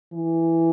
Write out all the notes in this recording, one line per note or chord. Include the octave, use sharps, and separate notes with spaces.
E3